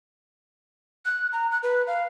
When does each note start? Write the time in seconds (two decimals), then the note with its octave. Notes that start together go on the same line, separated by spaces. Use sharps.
1.05 F#6
1.33 A#5
1.51 F#6
1.63 B4
1.87 F5